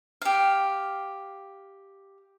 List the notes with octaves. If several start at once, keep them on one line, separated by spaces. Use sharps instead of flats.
G4 F5